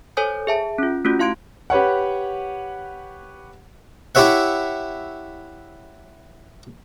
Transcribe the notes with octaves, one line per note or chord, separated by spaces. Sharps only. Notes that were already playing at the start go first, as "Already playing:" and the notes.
A4 C5 C#5 G#5 D#6 G6
G#4 E5 A5
C#4 F4
A3 C#4 F4 F#4
E4 F5 C6 G#6 D7
G4 B4 C#5 F#5
E4 G4 C#5 E5 F#5